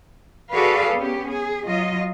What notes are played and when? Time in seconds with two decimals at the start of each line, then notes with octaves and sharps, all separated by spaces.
0.52 F#4 G#4 A4 B4 D5 F5
0.94 B3 C#4 G4
1.27 G#4
1.66 F#3 F4 D#5